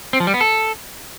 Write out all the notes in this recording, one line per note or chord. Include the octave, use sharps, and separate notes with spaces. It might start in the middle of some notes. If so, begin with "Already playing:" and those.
C4
F3
G3
B3
A4